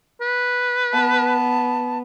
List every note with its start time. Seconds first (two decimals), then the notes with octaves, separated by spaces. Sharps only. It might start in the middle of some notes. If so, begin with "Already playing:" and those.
0.21 B4
0.93 B3 A5